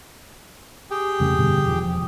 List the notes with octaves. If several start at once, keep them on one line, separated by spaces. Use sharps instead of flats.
G4 G#4 G5
F2 C#3 A3
G2 B2 D3
E1 F3